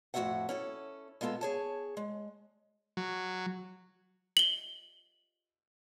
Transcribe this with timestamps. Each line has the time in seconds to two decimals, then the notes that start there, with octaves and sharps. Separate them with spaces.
0.14 F2 A2 F4 F#4 E5 F#5
0.49 C#4 E4 A4
1.21 G#3 B3 F4 G#4 A4
1.41 G#4 C#5 A5
1.97 G#3
2.97 F#3
4.37 F#7 G7